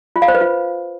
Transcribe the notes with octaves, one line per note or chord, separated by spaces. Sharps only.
F4
F5
C5
B4
F4